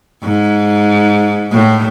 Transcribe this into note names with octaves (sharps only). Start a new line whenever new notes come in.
G#2
A2